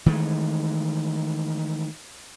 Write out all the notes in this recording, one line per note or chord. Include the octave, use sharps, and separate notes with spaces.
D#3 E3 G#3 A3